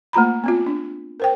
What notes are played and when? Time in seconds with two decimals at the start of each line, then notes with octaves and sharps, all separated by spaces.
0.13 A3 A#3 F4 A#5 B5
0.44 B3 C4 F4
0.66 D4
1.20 A#4 C5 G5